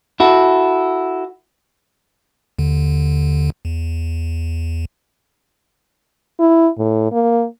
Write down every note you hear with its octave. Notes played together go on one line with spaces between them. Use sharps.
E4 F#4 A4
D#2 D3
E2
E4
A2
A#3